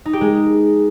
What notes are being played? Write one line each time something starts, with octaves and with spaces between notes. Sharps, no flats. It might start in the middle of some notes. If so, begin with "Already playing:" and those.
D#4
G4
G#3